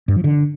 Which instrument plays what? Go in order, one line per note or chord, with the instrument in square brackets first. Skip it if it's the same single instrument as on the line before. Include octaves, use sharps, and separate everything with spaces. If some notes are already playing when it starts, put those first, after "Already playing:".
[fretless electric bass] G2
F3
D3